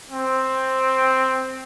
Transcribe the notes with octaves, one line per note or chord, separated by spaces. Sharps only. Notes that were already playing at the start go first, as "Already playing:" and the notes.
C4